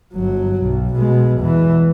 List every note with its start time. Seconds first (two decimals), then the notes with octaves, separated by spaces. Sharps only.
0.14 G1 F#3
0.62 B1
0.94 B2 G#3
1.39 E2 E3